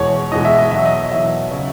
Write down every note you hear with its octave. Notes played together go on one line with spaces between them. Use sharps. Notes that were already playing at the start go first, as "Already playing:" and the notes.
Already playing: E2 B2 G#3 C#5
E2 B2 G#3 D#5
E5
D#5
E2 B2 F#3 E5
D#5
E2 B2 F#3 E5
C#3 F#3 C#4